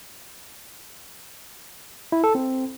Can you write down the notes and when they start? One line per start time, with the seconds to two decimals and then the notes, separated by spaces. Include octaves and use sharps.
2.12 E4
2.24 A4
2.35 C4